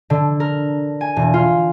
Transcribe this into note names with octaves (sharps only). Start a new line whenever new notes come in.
D3
A#4
G#5
E1
F4